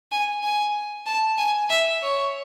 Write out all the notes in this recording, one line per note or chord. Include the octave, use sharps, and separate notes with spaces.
G#5
G#5
A5
G#5
E5
C#5